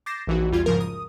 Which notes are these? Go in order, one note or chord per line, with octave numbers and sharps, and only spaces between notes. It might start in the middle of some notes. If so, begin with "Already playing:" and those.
D6 G6 A6 A#6 C7 E7
A#1 E3 D#4 F#4
E2 G3 F4 G#6
G#2 C#3 F3 A#4
D#6